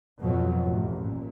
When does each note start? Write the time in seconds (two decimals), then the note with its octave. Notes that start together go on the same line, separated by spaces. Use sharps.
0.21 F2 B2 F#3
0.64 A1 E2
1.00 A#2